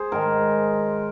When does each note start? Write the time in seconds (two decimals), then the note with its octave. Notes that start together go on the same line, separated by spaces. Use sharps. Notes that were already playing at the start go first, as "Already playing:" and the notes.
Already playing: G#4 C5
0.12 G#2 D#3 G#3 A#4